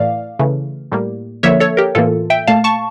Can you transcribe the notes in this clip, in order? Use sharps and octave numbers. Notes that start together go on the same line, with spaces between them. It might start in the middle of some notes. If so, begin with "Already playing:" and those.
Already playing: A2 E3 A3 D5 F5
C#3 E3 A3
A2 G3 A#3
D3 F3 A#3 C#5 E5
A4 C#5
G4 A#4
A2 E3 A#3 F4 A4
E5 G5
A#2 A3 F5 A5
A5 C#6